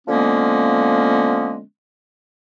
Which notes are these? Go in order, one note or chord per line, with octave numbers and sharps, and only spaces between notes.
D3 F3 G#3 A#3 B3 C#4